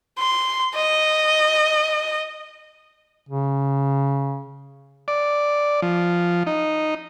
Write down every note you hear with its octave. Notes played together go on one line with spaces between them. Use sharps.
C6
D#5
C#3
D5
F3
D#4